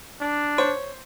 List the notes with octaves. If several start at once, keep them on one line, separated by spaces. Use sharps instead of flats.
D4
C5 C#5